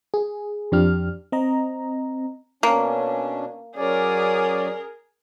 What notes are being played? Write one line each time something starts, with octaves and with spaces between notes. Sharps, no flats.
G#4
F2 F3 D4 G4 F6
C4 D#5 A#5
B2 A#3 C#4 D4
F#3 C#4 G#4 A#4 D5